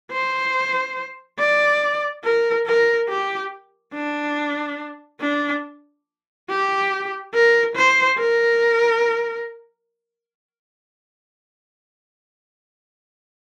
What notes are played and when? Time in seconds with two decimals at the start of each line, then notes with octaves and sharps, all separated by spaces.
0.12 C5
1.39 D5
2.24 A#4
2.66 A#4
3.09 G4
3.94 D4
5.21 D4
6.49 G4
7.34 A#4
7.76 C5
8.19 A#4